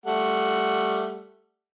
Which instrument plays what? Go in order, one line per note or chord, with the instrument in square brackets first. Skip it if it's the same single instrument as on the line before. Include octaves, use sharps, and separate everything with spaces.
[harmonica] G3 A3 F#5